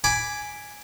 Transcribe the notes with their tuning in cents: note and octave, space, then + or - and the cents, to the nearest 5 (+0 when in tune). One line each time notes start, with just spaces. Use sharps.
G#5 +0 B5 +5 D6 +0